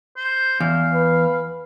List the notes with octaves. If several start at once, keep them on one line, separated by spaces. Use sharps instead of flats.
C5
E2 F5
B4